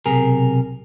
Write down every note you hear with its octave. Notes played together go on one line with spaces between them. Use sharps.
B1 C3 G#4 A#4